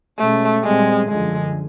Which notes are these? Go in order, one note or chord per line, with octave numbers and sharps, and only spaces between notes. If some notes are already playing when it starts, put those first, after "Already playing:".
B2 G#3 A3 C#4
A#2 G3 G#3 C4
F#2 D3 F3 G#3